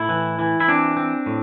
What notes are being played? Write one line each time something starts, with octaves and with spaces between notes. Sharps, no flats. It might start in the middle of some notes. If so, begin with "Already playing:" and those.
Already playing: A2 E4
E3
E3
E4
C4 D4
C4
A2